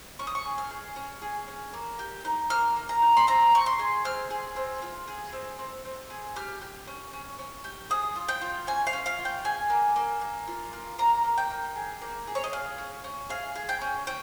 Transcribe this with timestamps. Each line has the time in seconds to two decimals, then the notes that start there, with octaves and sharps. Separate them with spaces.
0.19 C#4 C#6
0.27 D#6
0.35 C#6
0.45 G#4
0.58 F6
0.71 G#4
0.96 C#4
1.22 G#4
1.48 C#4
1.73 A#3
1.99 G4
2.25 D#4
2.50 A#3 F6
2.76 A#3
2.89 A#5
3.02 D#4
3.17 C6
3.27 C4 A#5
3.53 C4 C#6
3.66 C6
3.79 G#4
4.05 C4 F6
4.30 G#4
4.56 C4
4.82 F4
5.08 G#4
5.33 C4
5.59 C4
5.85 C4
6.10 G#4
6.36 G4 F6
6.61 G4
6.87 C#4
7.13 C#4
7.39 C#4
7.64 G4
7.90 G#4 D#6
8.16 F4
8.29 G5
8.41 F4
8.67 C#4 G#5
8.87 F5
8.93 C#4
9.06 F5
9.19 F4
9.25 G5
9.45 G#4 G#5
9.70 A#3
9.96 A#3
10.21 A#3
10.48 F4
10.73 A#3
10.98 A#3 A#5
11.24 A#3
11.37 G5
11.50 A#3
11.76 G#4
12.01 A#3
12.27 G#4
12.35 C#5
12.44 D#5
12.53 G#4 F5
12.78 C#4
13.04 C#4
13.29 G#4 F5
13.55 G#4
13.69 G5
13.81 C#4
14.07 C#4 G5